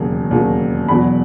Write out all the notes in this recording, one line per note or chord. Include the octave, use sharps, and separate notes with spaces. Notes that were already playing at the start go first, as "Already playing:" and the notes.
Already playing: E1 D#2 C#3 F#3
E1 D#2 C#3 F#3
E1 E2 B2 F#3 B5